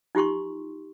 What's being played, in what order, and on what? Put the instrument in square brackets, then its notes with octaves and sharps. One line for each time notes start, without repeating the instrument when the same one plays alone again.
[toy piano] D#4 F4 G4 C6 C#6